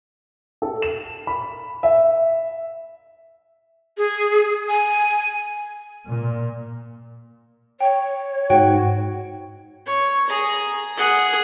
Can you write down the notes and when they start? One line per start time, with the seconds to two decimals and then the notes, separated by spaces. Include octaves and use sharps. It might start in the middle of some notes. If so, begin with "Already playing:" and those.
0.62 A4
0.82 E7
1.27 B5
1.83 E5
3.97 G#4
4.69 G#5
6.07 A#2
7.80 C#5 G5
8.50 G#2 F#4 G5
9.86 C#5
10.27 G#4 A#5
10.97 G#4 F#5